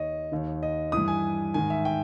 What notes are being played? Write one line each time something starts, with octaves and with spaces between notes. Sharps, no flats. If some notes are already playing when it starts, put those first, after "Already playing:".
Already playing: D#2 D#3 C#5 D#5
D#2 D#3
D#5
G2 E3 D#6
G#5
G#2 D#3 G#5
E5
G5